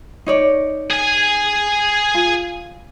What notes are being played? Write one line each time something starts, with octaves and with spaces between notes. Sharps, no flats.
D#4 C#5 D5
G#4 G#5
F4